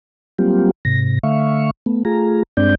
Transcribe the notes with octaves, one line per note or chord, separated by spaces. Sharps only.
F#3 G3 A#3 C4 F4 G4
G#2 C3 A#6
D3 A3 E5 F5 C#6
A3 B3
A3 F4 G#4 A#5
G2 G#3 C4 D4 D5 G6